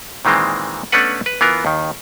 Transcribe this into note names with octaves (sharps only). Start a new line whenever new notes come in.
A#2 D#3 E3 G#3 C4
A3 B3 C#4 D4 B4 F#5
B4
E3 B3 F4 A#4
D#2 D#3